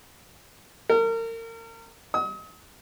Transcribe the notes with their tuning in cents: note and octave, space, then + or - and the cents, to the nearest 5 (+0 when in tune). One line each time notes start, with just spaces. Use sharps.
A#4 -35
D#6 +40